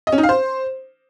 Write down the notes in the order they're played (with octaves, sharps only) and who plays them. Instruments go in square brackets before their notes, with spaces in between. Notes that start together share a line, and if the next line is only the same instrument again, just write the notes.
[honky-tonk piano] D#5
C#4
D#4
F5
C5